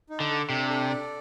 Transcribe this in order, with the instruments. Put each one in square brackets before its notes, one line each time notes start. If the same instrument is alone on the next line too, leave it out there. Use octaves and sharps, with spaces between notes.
[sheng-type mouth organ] D#4
[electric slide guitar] D3
[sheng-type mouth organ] A4
[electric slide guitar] C3 [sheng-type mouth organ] D4
[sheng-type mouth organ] A4
D5